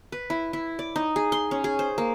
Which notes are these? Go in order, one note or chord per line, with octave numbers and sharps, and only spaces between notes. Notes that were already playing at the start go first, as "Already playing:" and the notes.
B4
E4
E4
D5
D#4
G#4
C6
C#4
G#4
C5
A#3